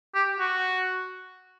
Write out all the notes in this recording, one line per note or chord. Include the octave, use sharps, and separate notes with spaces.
G4
F#4